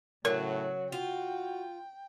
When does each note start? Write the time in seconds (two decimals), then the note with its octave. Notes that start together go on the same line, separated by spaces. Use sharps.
0.25 A2 C#3 F#3 F#4 A#4
0.92 F4 F#4 G5